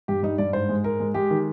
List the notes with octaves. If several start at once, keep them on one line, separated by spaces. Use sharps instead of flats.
G2 G4
G3 D#4
G2 D5
G#2 C5
G#3
G#2 A#4
G#3
G#3 G4
D#3